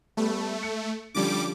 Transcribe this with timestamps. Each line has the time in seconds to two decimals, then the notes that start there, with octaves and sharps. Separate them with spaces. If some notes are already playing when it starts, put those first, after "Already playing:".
0.17 G3 A3 B3
0.63 C#7
1.14 D3 F3 G3 C#4 D6